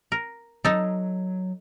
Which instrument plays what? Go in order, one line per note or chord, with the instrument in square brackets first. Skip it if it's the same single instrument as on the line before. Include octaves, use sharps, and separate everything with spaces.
[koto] A#4
[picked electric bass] F#3 [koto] D#4 A4